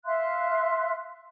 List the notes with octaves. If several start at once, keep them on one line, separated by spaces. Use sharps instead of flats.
E5 F5 C6 F#6